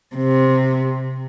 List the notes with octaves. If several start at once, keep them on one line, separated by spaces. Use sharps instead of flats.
C3